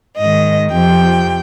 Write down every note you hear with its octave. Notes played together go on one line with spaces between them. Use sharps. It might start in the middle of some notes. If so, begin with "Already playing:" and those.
G#2 D#3 D#5
F2 C3 F3 G5